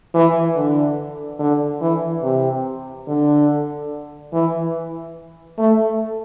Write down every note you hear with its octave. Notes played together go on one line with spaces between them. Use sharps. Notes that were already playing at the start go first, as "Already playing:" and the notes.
E3
D3
D3
E3
C3
D3
E3
A3